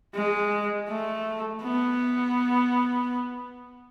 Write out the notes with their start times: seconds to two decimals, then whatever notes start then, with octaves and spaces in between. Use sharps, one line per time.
0.14 G#3
0.89 A3
1.62 B3